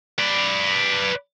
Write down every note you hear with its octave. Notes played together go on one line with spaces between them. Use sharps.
B4 D5